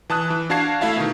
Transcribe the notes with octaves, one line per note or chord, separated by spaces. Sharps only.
E3 A5 D#6 F#6
E3
D4 F#4 F5 A5 G#6 C7
A3 E4 E5 F5 A5
B2 D#3